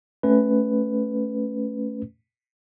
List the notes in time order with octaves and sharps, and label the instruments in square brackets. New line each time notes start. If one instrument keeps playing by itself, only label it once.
[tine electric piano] A3 C#4 B4